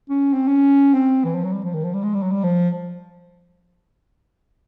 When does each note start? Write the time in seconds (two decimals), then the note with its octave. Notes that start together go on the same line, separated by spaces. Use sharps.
0.10 C#4
0.33 C4
0.48 C#4
0.94 C4
1.24 E3
1.35 F3
1.44 F#3
1.53 G3
1.64 F3
1.74 D#3
1.84 F3
1.94 G3
2.03 G#3
2.14 G3
2.23 F#3
2.32 G3
2.44 F3